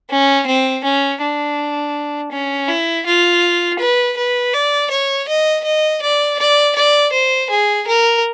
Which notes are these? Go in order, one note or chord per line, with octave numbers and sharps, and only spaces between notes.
C#4
C4
C#4
D4
C#4
E4
F4
B4
B4
D5
C#5
D#5
D#5
D5
D5
D5
C5
G#4
A#4